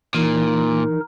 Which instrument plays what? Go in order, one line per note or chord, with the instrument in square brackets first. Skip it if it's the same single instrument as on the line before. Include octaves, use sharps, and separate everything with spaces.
[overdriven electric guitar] A#2 [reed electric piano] E3 [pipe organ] D#4 A#4